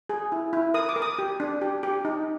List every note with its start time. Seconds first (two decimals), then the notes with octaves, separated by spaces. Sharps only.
0.09 G#4
0.32 E4
0.53 E4
0.74 A#4 D#6
0.89 D6
0.96 A#4
1.02 D#6
1.19 G4
1.40 D4
1.61 G4
1.83 G4
2.05 D#4